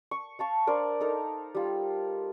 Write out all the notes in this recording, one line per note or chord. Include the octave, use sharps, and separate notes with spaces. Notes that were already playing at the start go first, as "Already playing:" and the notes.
C#6
F5 A5 C#6
D4 A#4 C5 D5
D#4 A4 A#4
G3 F4